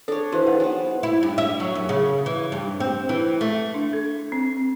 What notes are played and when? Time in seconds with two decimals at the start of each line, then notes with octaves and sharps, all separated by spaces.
0.08 D4 A4 C#5
0.32 E3 F#4 C5
0.47 D#4 G#4 F#5 G5
0.60 F#3 B3 G#5
1.03 E4
1.23 G2
1.38 E5
1.60 F#3
1.75 F#2
1.89 C#3
2.26 E3
2.52 G2
2.80 C4
3.09 E3
3.41 A3
3.74 D4
3.93 A4
4.32 C4